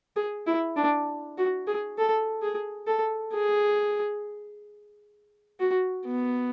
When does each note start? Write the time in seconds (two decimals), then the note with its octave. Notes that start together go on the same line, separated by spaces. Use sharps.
0.16 G#4
0.47 E4
0.76 D4
1.38 F#4
1.67 G#4
1.98 A4
2.42 G#4
2.87 A4
3.34 G#4
5.59 F#4
6.05 B3